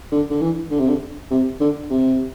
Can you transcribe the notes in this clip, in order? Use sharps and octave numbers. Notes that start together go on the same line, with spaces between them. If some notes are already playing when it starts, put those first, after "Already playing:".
D3
D3
E3
D3
C3
D3
C3
D3
C3